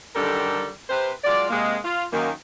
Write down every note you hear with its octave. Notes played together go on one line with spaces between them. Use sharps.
F#2 D3 D#3 G3 A4 A#4
C3 B4 C5
F#3 G#3 F4 D5
C3 G#3 A#3
F4
F#2 D#3 A#3